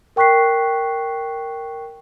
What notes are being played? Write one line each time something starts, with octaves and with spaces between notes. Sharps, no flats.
A#4 G5 C#6 F#6 B6 C7